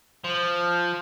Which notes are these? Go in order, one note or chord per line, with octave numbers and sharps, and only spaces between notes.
F3